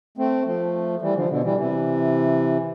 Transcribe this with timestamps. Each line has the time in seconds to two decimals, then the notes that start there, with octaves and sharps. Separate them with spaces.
0.17 A3 C4
0.45 F3 A3
1.01 E3 G3
1.15 D3 F3
1.29 B2 D3
1.43 E3 G3
1.57 C3 E3